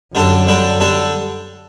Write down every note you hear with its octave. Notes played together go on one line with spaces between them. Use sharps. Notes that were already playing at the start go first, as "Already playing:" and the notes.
F#2 D3 G3 D4 A4
D3 G3 D4 A4
D3 G3 D4 A4